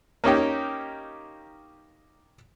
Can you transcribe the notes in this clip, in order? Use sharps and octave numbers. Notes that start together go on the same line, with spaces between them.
A#3 C#4 D#4 G4